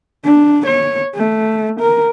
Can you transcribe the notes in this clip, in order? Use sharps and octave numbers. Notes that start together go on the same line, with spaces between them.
D4
C#5
A3
A#4